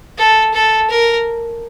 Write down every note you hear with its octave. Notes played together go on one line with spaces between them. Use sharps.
A4
A4
A#4